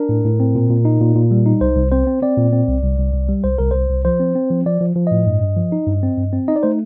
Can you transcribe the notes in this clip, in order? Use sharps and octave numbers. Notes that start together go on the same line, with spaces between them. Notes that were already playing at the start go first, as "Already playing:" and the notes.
Already playing: D4 A#4
A2
A2
C4
A#2
A#2
D#4
A#2
A#2
G3
D#4
C2 C5
C2
C4 C5
C4
C4 D5
A#2
C4
C2
C2
C2
C2
G3
C2 C5
C2 A#4
C2 C5
C2
F3 C5
C4
C4
F3
F3 D5
F3
F3
A2 D#5
G2
G2
F3
D#4
G2
C4
G2
C4
D#4 D#5
D5
A3 C5